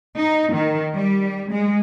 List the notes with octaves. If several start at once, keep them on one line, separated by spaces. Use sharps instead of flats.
D#4
D#3
G3
G#3